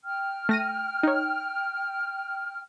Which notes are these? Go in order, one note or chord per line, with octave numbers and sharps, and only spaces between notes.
G5 F6
A3 A#6 D#7
D#4 C#5